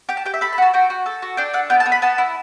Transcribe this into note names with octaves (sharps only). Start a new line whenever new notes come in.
G4 G5
A5
G4 G5
E5
A4 B5
B5
F#4 A5
F#4 G5
F#4
A4
F#4
D4 G5
A4 F#5
B3 G5
A5
B3
B5
B3 A5
E4